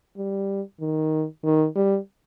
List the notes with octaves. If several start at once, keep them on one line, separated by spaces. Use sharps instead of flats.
G3
D#3
D#3
G3